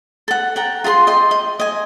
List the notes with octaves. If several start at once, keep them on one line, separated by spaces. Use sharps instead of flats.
A4 F#5
F#5 G5 A#5
F4 G#4 A#5 C6
D#5 G5 C6
D#5
D#5 G#5